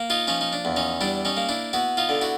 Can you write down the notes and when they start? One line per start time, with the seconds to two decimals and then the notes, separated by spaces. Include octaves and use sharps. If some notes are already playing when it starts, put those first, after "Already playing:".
Already playing: A#3
0.10 D#4 F4
0.27 F3 C#4 D#4
0.41 D#4
0.53 D4
0.65 E2
0.76 C#4 D#4
1.01 G3 D4 E4
1.25 C#4 D#4
1.37 A#3
1.49 D4 E4
1.73 B3 E4 F#4
1.97 D#4 F4
2.09 D3
2.21 E4 F#4